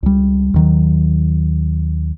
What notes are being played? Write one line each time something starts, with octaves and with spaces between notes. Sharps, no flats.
C#2 G3
D#2 D#3 F#3